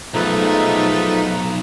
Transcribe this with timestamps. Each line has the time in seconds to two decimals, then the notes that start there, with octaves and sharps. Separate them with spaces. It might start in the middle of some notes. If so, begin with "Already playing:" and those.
0.14 B1 F3 G#3 A3 D#4 B4